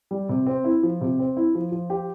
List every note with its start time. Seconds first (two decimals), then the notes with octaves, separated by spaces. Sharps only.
0.11 G3
0.29 C3
0.46 C4
0.64 E4
0.83 F3
1.01 C3
1.19 C4
1.37 E4
1.55 F3
1.72 F3
1.90 G4